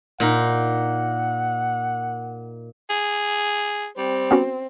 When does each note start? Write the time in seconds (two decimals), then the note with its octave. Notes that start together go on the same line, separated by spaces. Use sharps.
0.20 A#2 D#4 F#5
2.90 G#4
3.98 G3 C4
4.31 B3 C#4 F#4